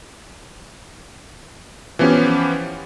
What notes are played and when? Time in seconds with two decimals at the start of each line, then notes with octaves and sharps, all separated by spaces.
1.99 E3 F3 B3 C#4 G4